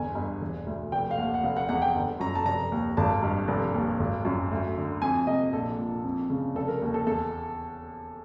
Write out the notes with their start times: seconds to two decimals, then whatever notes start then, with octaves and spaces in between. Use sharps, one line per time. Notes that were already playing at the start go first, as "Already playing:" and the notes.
Already playing: G1 E2 G#5
0.15 G2
0.41 E1
0.66 D2
0.92 F1 G5
1.11 F5
1.18 D#2 F#5
1.34 F#5
1.43 F1 F5
1.57 F#5
1.69 E2 F#5
1.82 G5
1.95 G1
2.20 F#2 A#5
2.35 A5
2.46 F1 A#5
2.72 D#2
2.97 G#1 A5
3.23 G2
3.48 F1
3.74 D#2
4.00 G#1
4.25 F#2
4.51 D2
4.77 D3
5.02 F2 G#5
5.27 C3 D#5
5.53 A#1 A4
5.79 A#2
6.04 F2
6.30 C#3
6.55 F1 A4
6.68 A#4
6.81 D#2
6.94 A4
7.07 E2 A4